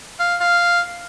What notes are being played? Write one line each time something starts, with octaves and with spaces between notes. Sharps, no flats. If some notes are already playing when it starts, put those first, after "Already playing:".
F5
F5